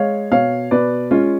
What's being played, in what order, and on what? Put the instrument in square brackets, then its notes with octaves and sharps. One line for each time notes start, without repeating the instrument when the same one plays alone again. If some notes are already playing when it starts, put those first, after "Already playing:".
Already playing: [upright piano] G#3 C#5 F5
B2 C#5 F5
B2 B4 D5
G#3 C#4 F4